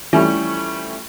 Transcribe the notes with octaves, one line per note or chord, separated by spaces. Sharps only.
E3 F3 G3 A3 C#4